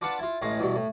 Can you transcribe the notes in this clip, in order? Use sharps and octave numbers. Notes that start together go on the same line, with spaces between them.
D4 F4 B4 F#5 A5
E4 F4
A1 A2 G#3 F5 A#5
E2 G2 B2
A2